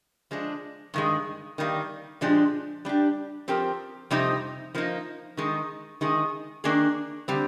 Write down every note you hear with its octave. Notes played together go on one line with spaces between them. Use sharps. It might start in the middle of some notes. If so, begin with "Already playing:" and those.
F3 G#3 D4
G2 D#3 G#3
D#3 G3 A#3
A#2 F3 G#3 D4 G4
G3 D4 G4
F3 C4 G4 A#4
F2 C3 G3 C4 D#4
F3 A#3 D#4
D#3 G#3 D#4
D#3 G#3 D#4 G#4
D#3 A#3 D4 G#4
D3 G3 C4